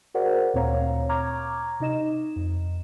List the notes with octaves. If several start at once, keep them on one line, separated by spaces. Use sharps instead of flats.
F#4 G#4 A#4 C5 D5 F#5
D2 A#2 C4 C#5 F5 A#5
A#5 C#6 D6 F6 G#6
C3 D#4 D#5 E7
F2